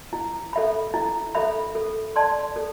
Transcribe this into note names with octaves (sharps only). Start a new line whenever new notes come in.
E4
A4 E5 B5
E4
A4 E5 B5
A4
D5 A5 C6
A4